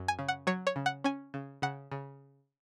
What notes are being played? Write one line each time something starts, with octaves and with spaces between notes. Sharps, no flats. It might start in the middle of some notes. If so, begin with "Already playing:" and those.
Already playing: F#2
G#5
C#3
F#5
F#3 C#5
C#5
C#3
F#5
C#4 G#5
C#3
C#3 F#5
C#3